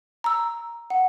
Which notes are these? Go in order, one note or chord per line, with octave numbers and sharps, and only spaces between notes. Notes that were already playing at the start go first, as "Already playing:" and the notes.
A#5 E6
F#5